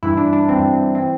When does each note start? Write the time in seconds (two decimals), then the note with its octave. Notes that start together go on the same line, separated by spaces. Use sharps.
0.03 G2 E3 E4
0.17 D4
0.33 D4
0.49 G2 E3 C4
0.95 E3 C4